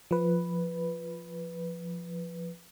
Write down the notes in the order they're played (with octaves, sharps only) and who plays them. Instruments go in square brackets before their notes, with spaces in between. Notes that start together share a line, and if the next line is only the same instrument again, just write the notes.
[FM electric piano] F3 B4